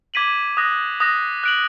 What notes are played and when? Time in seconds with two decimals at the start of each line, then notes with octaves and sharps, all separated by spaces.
0.14 D6 G#6 B6 D#7 F#7
0.57 D#6 F#6 A#6
1.00 D#6 F#6 A#6
1.44 F#6 D7 F#7